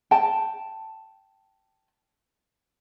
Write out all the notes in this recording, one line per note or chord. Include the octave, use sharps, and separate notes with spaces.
G5 A5